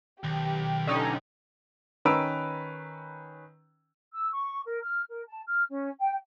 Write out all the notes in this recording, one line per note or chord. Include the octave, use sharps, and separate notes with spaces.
B1 D#3 G4
D3 C#4 D#4
D#3 C#4 B4 A#5 E6 D7
E6
C#6
A#4
F6
A#4
A5
F6
C#4
G5